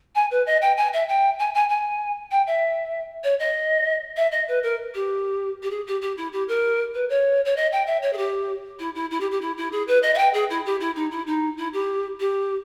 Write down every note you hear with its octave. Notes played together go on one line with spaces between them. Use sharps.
G#5
B4
D#5
G5
G#5
E5
G5
G#5
G#5
G#5
G5
E5
C#5
D#5
E5
D#5
B4
A#4
G4
G4
G#4
G4
G4
E4
G4
A#4
B4
C#5
C#5
D#5
G5
E5
C#5
G#4
G4
E4
E4
E4
G4
G4
E4
E4
G#4
B4
D#5
E5
G5
G#4
E4
G4
E4
D#4
E4
D#4
E4
G4
G4